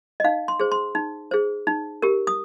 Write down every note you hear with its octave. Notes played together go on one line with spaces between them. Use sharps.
D#5
D#4 F5
C6
G#4 C5
C6
D#4
G#4 C5
D#4
G4 A#4
D#6